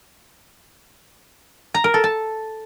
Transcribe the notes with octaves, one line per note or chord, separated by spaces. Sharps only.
A#5
A#4
A4
A5